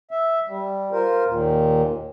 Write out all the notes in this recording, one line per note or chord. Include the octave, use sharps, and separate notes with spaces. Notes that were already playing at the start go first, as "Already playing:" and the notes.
E5
G3
F4 A#4 C5
D#2 A#2